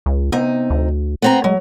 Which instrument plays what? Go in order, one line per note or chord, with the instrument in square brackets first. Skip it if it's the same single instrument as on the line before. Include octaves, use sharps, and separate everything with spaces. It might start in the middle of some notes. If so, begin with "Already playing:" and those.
[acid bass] C#2
[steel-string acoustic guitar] C3 D#4 [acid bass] B3
[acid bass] D2
[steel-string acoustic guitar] B3 C4 A#5
[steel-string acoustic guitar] F#3 [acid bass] G#3